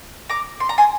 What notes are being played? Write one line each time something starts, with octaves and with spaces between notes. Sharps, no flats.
A#5 D6
C6
A#5
G#5 C6